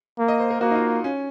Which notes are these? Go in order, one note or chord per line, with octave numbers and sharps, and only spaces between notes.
A#3
D#5
C5
A#4
A#3 F#4
D#4
F4
C#4